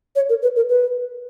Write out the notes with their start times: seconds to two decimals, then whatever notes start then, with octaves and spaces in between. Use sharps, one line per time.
0.16 C#5
0.29 A#4
0.42 B4
0.56 A#4
0.69 B4